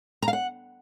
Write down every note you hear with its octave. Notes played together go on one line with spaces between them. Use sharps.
A#5
F5
F#5